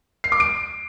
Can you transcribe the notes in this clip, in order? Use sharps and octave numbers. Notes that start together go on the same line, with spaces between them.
C7
D6
D7